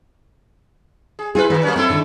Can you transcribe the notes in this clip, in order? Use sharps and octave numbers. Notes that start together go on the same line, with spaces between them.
G#4
E4 F4 G#4 B4
D#3 B4
F#3 A#3 C#4
A3 C4 E4 A4
D3 D#3